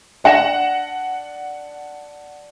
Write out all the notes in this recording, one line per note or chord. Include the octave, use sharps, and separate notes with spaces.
D4 F#5 A#6 E7